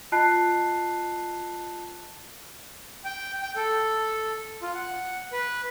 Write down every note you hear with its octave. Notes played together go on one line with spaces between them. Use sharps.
F4 D#5 A5 F#6 C7
G5
G5
A4
F4
F#5
B4